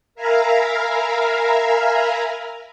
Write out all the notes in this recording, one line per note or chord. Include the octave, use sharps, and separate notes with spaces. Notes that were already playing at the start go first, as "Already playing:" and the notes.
A#4 E5 F5 G#5 A#5 B5